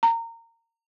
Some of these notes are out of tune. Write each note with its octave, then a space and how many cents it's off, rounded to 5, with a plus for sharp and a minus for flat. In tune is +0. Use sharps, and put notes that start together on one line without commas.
A#5 -20